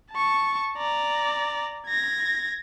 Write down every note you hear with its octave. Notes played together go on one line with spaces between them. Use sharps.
A5 C#6
D5 A#5
G#6 A#6